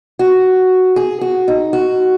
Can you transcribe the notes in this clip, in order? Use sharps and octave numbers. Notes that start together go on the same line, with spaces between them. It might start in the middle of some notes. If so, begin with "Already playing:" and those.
F#4
G#4
F#4
D#4
F#4